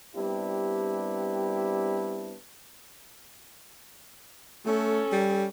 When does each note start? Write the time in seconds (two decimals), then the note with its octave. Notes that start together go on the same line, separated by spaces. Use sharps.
0.15 G3 B3 C4 D4 E4 G4
4.66 A3 C#4 A4
5.12 G3